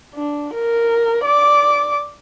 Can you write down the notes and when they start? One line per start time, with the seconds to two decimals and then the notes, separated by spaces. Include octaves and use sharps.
0.15 D4
0.54 A#4
1.25 D5 D6